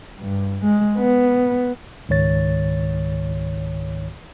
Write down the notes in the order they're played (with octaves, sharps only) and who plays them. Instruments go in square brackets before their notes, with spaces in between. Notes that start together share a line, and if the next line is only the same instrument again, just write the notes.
[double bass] G2
G#3
B3
[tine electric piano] C#2 G#2 D#3 C#5 A6